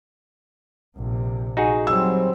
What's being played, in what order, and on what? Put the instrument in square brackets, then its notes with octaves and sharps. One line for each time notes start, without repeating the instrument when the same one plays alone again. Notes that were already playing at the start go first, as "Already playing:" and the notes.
[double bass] A#1 C3
[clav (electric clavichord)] D#4 F#4 G#4
[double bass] F#3 [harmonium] G3 C4 [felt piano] E6